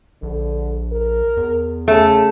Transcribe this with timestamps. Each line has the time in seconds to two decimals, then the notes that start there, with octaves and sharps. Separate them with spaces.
0.23 A#1 D3
0.92 A#4
1.37 E2
1.88 C#3 A3